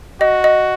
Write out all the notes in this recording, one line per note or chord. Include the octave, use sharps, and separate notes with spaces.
F#4 D#5
D#5